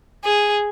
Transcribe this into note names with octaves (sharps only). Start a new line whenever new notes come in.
G#4